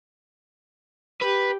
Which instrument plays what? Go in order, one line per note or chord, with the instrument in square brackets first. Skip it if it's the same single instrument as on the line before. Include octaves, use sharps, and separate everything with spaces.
[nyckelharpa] G4 [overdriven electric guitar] B4